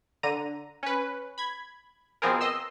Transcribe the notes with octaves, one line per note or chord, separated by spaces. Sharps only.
D3 A#5 D#7
C#4 B4
B5 G#6
B2 F3 C4 G#4 A#4
D#5 C6 E6